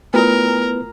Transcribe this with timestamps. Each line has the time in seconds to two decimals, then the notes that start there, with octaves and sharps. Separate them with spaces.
0.14 A3 B3 E4 F4 A#4 B4